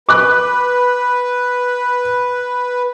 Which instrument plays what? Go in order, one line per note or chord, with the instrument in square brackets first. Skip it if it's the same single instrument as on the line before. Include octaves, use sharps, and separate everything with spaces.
[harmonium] B4 [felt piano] D6 F#6